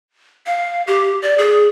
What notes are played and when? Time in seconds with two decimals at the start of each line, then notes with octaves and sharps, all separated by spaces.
0.46 F5
0.87 G4
1.22 D5
1.38 G#4